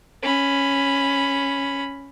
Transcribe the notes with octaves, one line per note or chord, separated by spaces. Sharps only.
C#4 B5